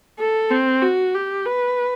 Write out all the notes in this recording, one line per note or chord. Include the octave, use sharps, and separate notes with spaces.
A4
C4
F#4
G4
B4